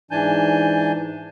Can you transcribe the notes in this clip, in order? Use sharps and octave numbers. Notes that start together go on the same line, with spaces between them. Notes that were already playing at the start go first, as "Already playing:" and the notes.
G#2 E3 D4 G#5 A5 G6